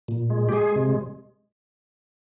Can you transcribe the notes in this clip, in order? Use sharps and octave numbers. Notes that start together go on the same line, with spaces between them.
A#2
G#3
G4
G#3 G#4
C3